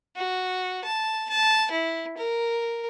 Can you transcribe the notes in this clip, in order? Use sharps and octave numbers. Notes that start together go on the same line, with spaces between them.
F#4
A5
A5
E4
A#4